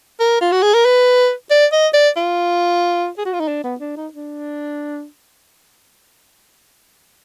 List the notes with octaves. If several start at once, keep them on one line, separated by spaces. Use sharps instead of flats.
A#4
F4
F#4
G#4
A#4
B4
D5
D#5
D5
F4
G#4
F#4
F4
D#4
D4
B3
D4
D#4
D4